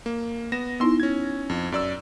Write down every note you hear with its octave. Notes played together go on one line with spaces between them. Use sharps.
A#3
B3 A#6 E7
B3 D#4 E4 C6 E6
C#4 G#6
F2
F#2 D5 E6